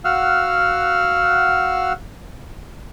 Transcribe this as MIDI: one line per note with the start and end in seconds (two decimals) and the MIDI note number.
0.05 1.93 66
0.05 1.93 77
0.05 1.93 78
0.05 1.93 88
0.05 1.93 89